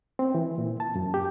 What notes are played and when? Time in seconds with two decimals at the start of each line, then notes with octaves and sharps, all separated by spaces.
0.19 C4
0.35 E3
0.58 A#2
0.80 A5
0.96 F#2
1.14 G4